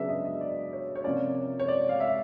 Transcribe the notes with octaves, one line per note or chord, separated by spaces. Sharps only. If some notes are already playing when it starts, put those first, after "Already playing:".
Already playing: C#3 F#3 B3 D4 E5
D#5
D#5
D5
C#5
C#5
C3 F3 A#3 C#4 D5
C#5
D5
F5
E5